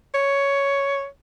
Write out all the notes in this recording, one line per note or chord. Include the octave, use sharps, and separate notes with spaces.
C#5